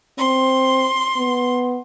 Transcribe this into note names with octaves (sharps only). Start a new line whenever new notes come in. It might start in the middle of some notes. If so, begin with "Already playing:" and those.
C4 C6
B3